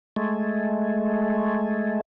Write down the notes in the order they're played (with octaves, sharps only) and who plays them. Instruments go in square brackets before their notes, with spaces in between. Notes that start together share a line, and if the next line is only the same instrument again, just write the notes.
[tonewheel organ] G#3 A3